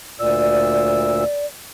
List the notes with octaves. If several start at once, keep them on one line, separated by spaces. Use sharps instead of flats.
D2 A#2 D5 E6